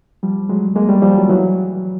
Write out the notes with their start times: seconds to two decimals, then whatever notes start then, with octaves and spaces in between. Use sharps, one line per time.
0.23 F3 G3
0.49 F#3 G#3
0.76 G#3 A#3
0.89 G3 A3
1.02 F3 G3
1.15 E3 F#3
1.29 E3 F#3